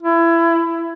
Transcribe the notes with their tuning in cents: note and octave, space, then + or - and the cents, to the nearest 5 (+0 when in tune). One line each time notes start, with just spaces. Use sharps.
E4 +25